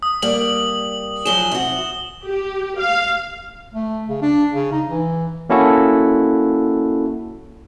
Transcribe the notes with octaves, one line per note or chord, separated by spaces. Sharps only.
D#6
G3 A#3 F#7
F3 F#3 G#4 E7 G7
C3 F#4
G4
F5
A3
C#3
D4
C#3
D#4
E3
A#3 C#4 E4 F#4 A4